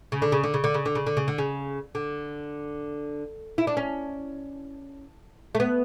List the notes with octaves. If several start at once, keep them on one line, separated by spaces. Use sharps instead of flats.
C#3
D3
C#3
D3
C#3
D3
C#3
D3
C#3
D3
C#3
D3
C#3
D3
E4
D4
C#4
A3
B3